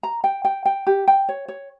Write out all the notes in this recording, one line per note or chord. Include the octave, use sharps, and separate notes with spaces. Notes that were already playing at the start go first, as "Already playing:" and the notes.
A#5
G5
G5
G5
G4
G5
C#5
C#5